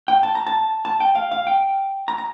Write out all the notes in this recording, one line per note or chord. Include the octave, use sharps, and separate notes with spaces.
G5
A5
A#5
A5
A5
G5
F5
F5
G5
A#5
A#5